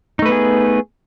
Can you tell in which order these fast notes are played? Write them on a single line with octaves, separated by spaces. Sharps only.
D#4 A3 B4 B3 G#4